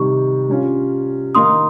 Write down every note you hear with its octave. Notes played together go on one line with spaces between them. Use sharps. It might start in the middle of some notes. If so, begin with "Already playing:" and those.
Already playing: C3 D#3 G3 C#6
G3 C#4 F4
D#3 A#3 D#4 C6 D#6